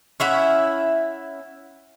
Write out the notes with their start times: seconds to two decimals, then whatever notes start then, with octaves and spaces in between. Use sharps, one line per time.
0.20 C#4 E4 E5 F#5